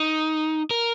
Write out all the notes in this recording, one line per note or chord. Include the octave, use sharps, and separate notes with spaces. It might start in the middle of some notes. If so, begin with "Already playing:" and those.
Already playing: D#4
A#4